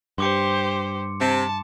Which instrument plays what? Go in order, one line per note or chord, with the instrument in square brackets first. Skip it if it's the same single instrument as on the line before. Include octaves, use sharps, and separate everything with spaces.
[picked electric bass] G2 [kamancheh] G4 C5 [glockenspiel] C6 D6 C#7
[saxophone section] C3 [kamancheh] A5